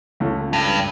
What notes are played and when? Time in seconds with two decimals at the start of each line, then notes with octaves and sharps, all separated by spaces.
0.20 C#2 A3 C#4
0.53 G2